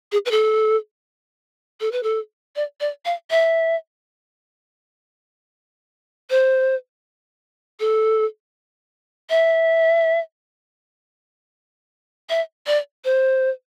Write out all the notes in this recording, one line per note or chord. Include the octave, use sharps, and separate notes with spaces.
G#4
B4
A4
A4
B4
A4
D5
D5
F5
E5
C5
A4
E5
E5
D5
C5